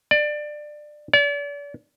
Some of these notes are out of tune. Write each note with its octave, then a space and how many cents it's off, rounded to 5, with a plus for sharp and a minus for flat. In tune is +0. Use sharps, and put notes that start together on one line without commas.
D5 +20
D5 -40